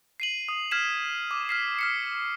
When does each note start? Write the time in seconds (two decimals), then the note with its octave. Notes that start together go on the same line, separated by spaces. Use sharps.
0.20 C7 D#7 F#7
0.49 D#6
0.71 F6 G#6 B6 C7 E7
1.31 D6
1.49 F6 B6 C7
1.79 F6 B6 C#7